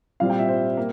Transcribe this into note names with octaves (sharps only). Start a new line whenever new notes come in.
A#2 G3 C4 F5
G5
E5
C5
A#3